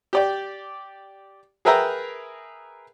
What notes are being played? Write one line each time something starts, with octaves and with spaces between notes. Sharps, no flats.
G4 D5 G5
G#4 A#4 B4 E5 G5 A#5